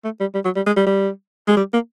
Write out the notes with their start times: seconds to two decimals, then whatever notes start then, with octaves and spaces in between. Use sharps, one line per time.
0.04 A3
0.20 G3
0.34 G3
0.45 F#3
0.56 G3
0.66 G#3
0.77 G3
0.87 G3
1.48 G#3
1.57 G3
1.74 A#3